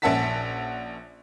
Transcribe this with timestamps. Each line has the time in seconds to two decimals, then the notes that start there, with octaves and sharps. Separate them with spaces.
0.02 A#1 C#4 E5 F#5 A5 B6